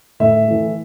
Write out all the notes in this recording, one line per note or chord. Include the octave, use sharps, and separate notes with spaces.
A2 E5
E3 A3